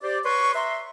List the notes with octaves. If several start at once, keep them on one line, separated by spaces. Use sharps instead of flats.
G4 C5 D5
B4 C#5 C6 C#6
E5 A#5 C6